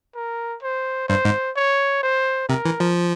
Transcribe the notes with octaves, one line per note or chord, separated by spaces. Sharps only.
A#4
C5
G2 C5
G#2
C#5
C5
C3 A#4
E3
F3